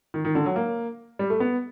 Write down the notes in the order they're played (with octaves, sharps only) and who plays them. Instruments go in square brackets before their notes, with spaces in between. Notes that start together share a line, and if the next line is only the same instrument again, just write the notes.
[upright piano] D#3
D#3
D3
F#3
A#3
G3
A3
B3